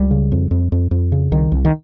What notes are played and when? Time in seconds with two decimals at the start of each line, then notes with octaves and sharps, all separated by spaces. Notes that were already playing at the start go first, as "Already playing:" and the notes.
Already playing: C#2 G3
0.11 C#3
0.32 F2
0.51 F2
0.72 F2
0.91 F2
1.12 C#3
1.32 C2 D#3
1.52 C2
1.65 D#3